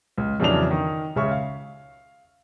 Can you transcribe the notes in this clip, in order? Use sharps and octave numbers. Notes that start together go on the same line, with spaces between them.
C#2
F2 C#3 E3 F#3 D4 F7
D#3
C#2 C#3 E5 C#6
F5